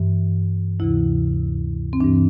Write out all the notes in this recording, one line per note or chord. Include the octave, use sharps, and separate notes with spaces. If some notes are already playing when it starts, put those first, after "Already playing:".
Already playing: G2 E3
D2 C3 E3 E4
C4
G2 E3 D4